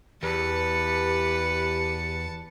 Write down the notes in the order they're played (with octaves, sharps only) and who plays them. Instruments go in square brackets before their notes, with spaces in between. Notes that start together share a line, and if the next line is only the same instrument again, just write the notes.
[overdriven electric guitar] E2 [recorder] G4 [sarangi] B4 [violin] A5 C#7